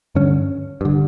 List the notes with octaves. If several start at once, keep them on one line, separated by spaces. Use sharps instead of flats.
G2 D3 C#4
G2 D3